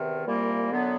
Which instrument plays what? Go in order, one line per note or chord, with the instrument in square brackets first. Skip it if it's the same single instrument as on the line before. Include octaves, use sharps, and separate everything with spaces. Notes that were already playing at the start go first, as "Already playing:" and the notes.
Already playing: [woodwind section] E2 C3 D#3
C2 A#2 G3 A#3
F#2 D3 F#3 B3